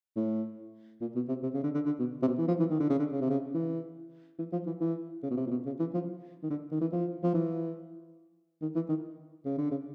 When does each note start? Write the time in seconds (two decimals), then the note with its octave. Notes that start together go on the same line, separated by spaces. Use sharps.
0.16 A2
1.01 A#2
1.15 B2
1.29 C3
1.43 C3
1.54 C#3
1.64 D3
1.75 D3
1.86 D3
1.99 B2
2.23 C3
2.28 B2
2.38 E3
2.48 F3
2.60 E3
2.71 D#3
2.80 D3
2.90 C#3
2.99 D3
3.13 C#3
3.21 C3
3.30 C#3
3.55 E3
4.39 E3
4.53 F3
4.67 E3
4.81 E3
5.23 C#3
5.31 B2
5.37 C3
5.47 A#2
5.51 B2
5.66 C#3
5.80 E3
5.94 F3
6.43 D#3
6.50 D3
6.72 D#3
6.81 E3
6.93 F3
7.24 F3
7.34 E3
8.62 D#3
8.75 E3
8.89 D#3
9.45 C#3
9.58 D3
9.71 C#3